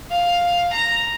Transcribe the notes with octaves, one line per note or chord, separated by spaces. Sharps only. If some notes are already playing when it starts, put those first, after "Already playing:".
F5
A#5